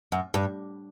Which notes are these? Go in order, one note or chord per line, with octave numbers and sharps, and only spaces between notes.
F#2
G2